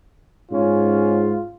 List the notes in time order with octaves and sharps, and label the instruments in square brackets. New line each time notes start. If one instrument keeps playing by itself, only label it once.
[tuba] G#2 [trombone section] C#4 [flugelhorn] F4